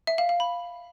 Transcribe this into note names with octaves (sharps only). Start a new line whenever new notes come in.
E5
F5
F5
B5